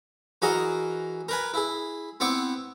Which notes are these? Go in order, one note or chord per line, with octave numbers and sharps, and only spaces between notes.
E3 F#4 G#4 A#4 D#5
A#4 B4 G#5
E4 G#4
B3 C4 E4 C#6 D6